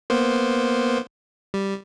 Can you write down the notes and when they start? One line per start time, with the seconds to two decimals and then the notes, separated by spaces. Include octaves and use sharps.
0.10 A#3 B3 C5
1.54 G3